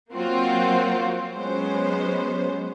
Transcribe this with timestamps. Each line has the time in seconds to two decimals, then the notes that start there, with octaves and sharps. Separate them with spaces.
0.13 F#3 A#3 C4 F4 F#4
1.34 F#3 G#3 B3 C#4 C5